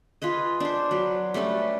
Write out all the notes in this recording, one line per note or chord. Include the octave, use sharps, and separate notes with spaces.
F4 G#4 B4 D#5
D4 C5
F#3 B4
G3 A3 C#4 B4